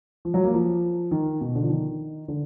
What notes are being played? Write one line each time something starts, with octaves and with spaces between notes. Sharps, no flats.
F3
F#3
A#3
F3
D#3
B2
D3
F3
D#3
D3